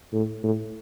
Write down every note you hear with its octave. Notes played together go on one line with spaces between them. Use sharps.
A2
A2